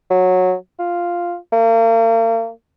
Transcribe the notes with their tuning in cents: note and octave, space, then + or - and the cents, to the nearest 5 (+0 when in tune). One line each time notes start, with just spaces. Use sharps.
F#3 -10
F4 +0
A#3 -40